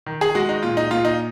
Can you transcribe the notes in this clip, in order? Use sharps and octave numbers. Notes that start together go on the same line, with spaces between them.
D#3
G#4
G#3 F#4
D#4
A#2 F4
D#4
A#2 F4
D#4